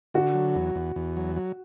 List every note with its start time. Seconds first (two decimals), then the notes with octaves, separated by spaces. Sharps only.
0.14 D3 F#4
0.34 F#3
0.55 E2
0.75 E2
0.96 E2
1.17 F#3
1.36 F#3